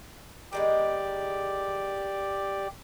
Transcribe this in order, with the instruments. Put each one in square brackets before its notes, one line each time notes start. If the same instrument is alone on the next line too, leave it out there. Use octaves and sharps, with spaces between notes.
[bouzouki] D#3 G#3 B3 [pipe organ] G4 D5